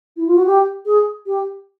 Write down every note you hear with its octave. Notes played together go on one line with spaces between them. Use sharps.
E4
F4
F#4
G4
G#4
G4